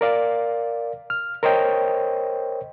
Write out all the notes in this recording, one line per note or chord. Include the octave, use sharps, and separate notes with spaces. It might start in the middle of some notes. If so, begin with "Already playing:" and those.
A#4 D5 F5
F6
A#4 C5 C#5 D#5 G5